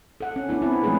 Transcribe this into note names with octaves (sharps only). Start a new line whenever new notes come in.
A4 F#5
C#4
B3 C#4 D4 E4
C4 E4
F3 G#3 A3 C#4 G#4 B4